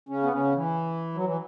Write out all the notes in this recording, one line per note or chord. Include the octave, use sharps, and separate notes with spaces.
C#3 C#4
B3
C#3 C#4
E3
F#3
E3